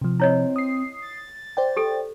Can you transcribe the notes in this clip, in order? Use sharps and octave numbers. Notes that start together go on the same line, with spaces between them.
C3 F3
C4 E4 C#5 D#5
D#6 C7
A6
C5 D5 G5
G4 A4